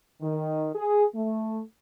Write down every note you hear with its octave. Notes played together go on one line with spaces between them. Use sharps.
D#3
G#4
A3